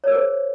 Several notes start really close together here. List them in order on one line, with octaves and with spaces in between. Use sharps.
C#5 A#4 G#4 C5